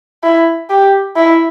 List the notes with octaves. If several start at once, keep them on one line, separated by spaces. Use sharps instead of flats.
E4
G4
E4